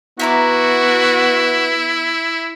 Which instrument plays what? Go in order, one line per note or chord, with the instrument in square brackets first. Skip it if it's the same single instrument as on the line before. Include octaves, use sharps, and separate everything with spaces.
[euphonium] B3 [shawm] E4 [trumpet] F#4 [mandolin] E5 A#5 D6